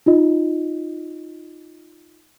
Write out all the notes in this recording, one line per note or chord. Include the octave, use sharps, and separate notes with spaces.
D#4 F4 D#5